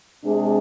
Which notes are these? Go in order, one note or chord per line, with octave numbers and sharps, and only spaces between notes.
C3 G#3 D4 G#4